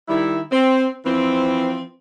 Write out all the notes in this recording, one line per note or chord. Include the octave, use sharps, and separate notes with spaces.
D#3 G3 E4
C4
E3 F3 C4